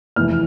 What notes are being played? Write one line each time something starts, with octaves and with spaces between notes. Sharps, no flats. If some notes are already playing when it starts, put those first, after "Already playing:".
F1 E2 E3 F6